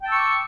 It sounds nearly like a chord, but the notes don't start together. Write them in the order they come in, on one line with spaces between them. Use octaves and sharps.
G5 A5 E6 C#6 D6